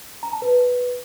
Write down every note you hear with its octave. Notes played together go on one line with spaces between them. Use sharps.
A#5
A5
B4